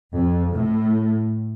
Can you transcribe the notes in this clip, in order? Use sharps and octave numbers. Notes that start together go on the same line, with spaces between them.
F2
A2